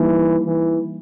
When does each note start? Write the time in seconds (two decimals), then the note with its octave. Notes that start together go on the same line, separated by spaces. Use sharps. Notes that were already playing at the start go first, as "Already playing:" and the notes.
Already playing: E3 G3 A#3 D#4 G4
0.46 E3